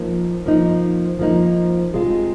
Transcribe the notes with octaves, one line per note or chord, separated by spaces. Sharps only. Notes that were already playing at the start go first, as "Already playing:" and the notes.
Already playing: F3 A#3 D#4
F3 A#3 D#4
F3 A#3 D#4
C3 G#3 F4